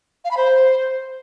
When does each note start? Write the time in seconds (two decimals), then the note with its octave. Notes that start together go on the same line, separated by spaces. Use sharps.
0.25 F5
0.31 B5
0.37 C5